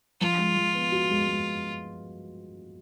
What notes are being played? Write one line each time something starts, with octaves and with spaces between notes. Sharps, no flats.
F3 F4
G#3
F3
B3
F#4
G#3
G#3